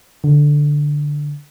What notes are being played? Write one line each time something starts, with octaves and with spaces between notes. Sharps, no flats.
D3